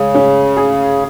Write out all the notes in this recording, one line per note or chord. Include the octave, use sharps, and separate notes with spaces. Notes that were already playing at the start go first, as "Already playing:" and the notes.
Already playing: C#3 G#3
C#4
G#4